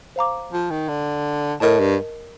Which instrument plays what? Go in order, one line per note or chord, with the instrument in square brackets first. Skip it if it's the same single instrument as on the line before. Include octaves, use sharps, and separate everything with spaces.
[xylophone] C5 F5 A#5 D6
[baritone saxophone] F3
D#3
D3
[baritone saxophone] A2 [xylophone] A#4 D#5 A5
[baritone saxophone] G2